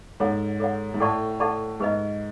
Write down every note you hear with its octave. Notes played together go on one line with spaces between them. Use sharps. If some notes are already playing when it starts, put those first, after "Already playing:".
G#2 A4 C#5 F#5
A4 C#5 F#5
G#2
A2 A4 D5 F#5 A5 C#6
A4 D5 F#5 A5 C#6
G#2 G4 B4 D#5